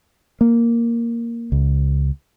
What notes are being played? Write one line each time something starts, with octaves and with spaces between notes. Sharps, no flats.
A#3
C#2